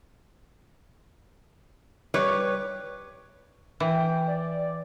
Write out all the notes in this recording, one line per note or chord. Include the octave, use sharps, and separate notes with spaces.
G3 G4 B4 C#5
E3 G5
D5